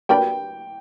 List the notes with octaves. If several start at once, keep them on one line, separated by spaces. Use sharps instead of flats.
F#3 A#3 D4 G4 B4 G5